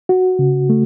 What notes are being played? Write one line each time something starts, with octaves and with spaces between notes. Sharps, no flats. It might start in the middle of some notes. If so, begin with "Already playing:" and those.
F#4
C#3
A3